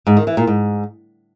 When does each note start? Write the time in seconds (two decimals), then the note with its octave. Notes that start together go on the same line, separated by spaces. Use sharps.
0.07 G#2
0.17 D#3
0.27 E3
0.37 A#2
0.47 G#2